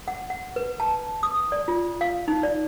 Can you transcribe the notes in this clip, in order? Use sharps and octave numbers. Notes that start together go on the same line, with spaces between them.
F#5
F#5
B4
A5
D#6
D5
F4
F5
D#4
D5